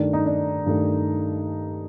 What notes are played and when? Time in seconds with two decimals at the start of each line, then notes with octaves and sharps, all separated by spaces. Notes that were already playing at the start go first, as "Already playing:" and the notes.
Already playing: G2 D#3 A3 D4
0.13 D#4
0.26 D4
0.66 G2 D#3 A3